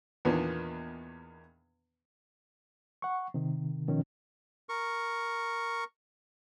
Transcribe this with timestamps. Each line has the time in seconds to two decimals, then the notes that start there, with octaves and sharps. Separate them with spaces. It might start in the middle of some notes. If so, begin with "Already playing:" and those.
0.25 E2 A#2 D#3 B3 D4
3.02 F#5 C#6
3.34 C3 D#3
3.88 B2 D#3 F3 C#4
4.69 A#4 C#6